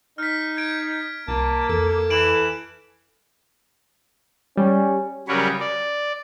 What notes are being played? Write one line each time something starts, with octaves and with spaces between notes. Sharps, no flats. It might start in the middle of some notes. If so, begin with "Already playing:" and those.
D#4 F6 B6
G#6 D7
C2 A#3 A5
F2 A4
E3 D7 E7 F#7
G3 C#4
C#3 F#3 G3 A#4 B4 C#5
D5